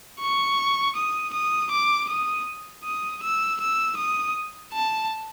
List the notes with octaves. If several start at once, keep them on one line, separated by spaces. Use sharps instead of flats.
C#6
D#6
D#6
D6
D#6
D#6
E6
E6
D#6
A5